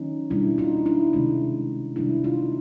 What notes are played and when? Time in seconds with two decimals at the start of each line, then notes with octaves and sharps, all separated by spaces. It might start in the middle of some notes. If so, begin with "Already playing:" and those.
Already playing: D#3 F#3 A#3 C#4 D#4
0.30 B2 G3 A#3 D4 E4
0.58 D#4 F4
0.86 D4 E4
1.13 C3 D#3 G#3 C#4 D#4
1.96 C3 D#3 G3 A#3 D4 E4
2.24 D#4 F4